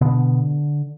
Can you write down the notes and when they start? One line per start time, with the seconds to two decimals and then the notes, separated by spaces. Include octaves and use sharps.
0.01 B2 D3 B3